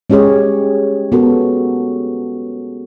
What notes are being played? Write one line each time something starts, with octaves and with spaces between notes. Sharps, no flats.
G#3 C#4 G4 G#4 C#5
B3 F#4 A4 A#4